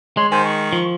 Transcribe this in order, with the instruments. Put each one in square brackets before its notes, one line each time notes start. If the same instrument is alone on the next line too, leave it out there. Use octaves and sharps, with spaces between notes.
[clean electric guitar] G#3 [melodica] C#5 C6
[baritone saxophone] D#3 [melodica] C5 G#5
[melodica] C#6
[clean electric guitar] F3